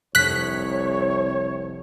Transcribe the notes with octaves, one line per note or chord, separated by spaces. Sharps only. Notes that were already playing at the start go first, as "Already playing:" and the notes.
F1 C2 C#5 F#6 B6